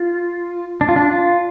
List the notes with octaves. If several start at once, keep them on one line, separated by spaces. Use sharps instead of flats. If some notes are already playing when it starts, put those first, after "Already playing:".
Already playing: F4
D4
F4
D4
F4